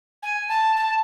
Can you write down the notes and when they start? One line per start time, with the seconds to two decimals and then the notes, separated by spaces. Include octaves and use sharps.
0.23 G#5
0.49 A5
0.76 A5